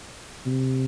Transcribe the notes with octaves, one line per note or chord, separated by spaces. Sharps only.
C3